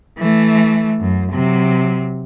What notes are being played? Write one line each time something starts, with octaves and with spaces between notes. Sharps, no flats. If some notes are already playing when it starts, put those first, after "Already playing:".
E3 A3
F#2
C3 F#3